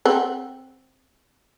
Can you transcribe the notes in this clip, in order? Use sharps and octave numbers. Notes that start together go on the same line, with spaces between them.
C4 F#5 G5